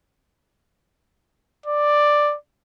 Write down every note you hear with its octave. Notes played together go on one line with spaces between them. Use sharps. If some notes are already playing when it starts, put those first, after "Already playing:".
D5